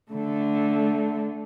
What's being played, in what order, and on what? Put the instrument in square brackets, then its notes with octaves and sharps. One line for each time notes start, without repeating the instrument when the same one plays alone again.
[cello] D3 A3